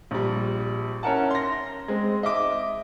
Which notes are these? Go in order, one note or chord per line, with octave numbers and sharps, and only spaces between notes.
A#1 G3
C#4 E4 A#4 F#5 A5
C6 A#6
G#3 C4
D#5 E5 D6